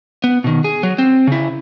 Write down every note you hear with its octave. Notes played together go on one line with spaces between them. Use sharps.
B3
B2 D#3
G#4
F#3
C4
C#3 E4